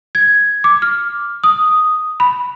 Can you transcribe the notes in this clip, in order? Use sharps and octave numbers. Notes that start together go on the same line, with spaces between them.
G#6
D6
F6
D#6
B5